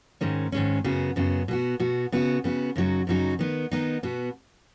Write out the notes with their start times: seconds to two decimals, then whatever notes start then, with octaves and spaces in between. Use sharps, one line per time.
0.21 G#2 D#3 G#3 C#4
0.52 G#2 D#3 G#3 C#4
0.84 F#2 C#3 B3 F#4
1.16 F#2 C#3 B3 F#4
1.48 B2 B3 F#4
1.80 B2 B3 F#4
2.12 C#3 B3 F#4
2.44 C#3 B3 F#4
2.76 F#2 C#3 F#3 D#4 F#4
3.07 F#2 C#3 F#3 D#4 F#4
3.39 D#3 B3 D#4
3.71 D#3 B3 D#4
4.03 B2 B3 F#4